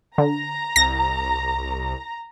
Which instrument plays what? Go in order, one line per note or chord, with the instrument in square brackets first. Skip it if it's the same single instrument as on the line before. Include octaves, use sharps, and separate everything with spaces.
[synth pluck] D3 [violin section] A#5
[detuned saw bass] C2 [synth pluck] A#6